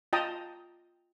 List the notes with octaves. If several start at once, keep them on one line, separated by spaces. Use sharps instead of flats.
F4 D#5 G5 A5 A#5 D#6